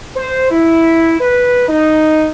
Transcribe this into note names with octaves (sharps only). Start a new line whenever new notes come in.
C5
E4
B4
D#4